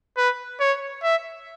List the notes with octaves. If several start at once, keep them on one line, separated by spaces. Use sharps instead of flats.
B4
C#5
E5